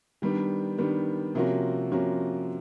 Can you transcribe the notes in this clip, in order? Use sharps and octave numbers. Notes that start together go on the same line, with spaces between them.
D#3 G3 B3 D4
D#3 G3 B3 D4
C3 F3 A#3 C#4 F#4
C3 F3 A#3 C#4 F#4